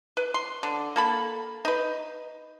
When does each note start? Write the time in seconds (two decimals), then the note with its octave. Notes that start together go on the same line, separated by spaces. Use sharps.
0.17 B4
0.34 C6
0.63 D3
0.96 A#3 A4 B5
1.65 D#4 B4